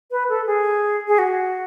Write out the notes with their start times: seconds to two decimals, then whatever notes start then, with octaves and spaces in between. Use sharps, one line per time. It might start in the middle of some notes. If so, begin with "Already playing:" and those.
0.11 B4
0.29 A4
0.47 G#4
1.08 G#4
1.19 F#4